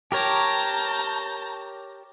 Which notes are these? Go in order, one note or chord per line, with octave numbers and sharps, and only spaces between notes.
G4 A#4 C#5 A5 A#5 G6